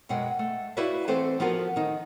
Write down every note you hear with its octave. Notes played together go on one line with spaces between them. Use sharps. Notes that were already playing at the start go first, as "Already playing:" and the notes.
F#2 B2 G#3 F#5 G5
A3
E4 F#4 B4 D5 E5 F5
E3 A3 C4 A4 B4 C5
F3 B3 F4 F#4 A#4
D#3 D#4